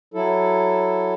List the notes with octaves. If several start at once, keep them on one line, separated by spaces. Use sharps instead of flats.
F#3 E4 A4